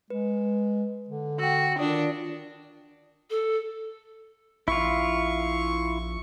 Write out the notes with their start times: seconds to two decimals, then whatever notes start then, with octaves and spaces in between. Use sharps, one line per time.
0.10 G#3 B4
1.09 D3
1.39 F#4 G5 E6
1.79 D#3 D4 F4 D5 D#6
3.30 A4
4.68 A#1 E4 F4 C#6